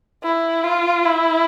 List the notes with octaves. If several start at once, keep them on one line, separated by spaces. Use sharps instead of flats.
E4
F4
E4